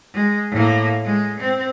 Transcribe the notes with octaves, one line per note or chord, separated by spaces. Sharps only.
G#3
A2 A#3
G#3
C4